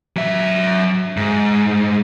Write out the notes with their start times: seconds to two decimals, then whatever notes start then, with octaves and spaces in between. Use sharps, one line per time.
0.17 F#3 E5
1.17 G#2